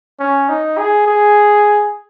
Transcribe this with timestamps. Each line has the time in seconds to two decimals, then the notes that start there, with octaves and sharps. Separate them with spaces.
0.20 C#4
0.49 D#4
0.78 G#4
1.07 G#4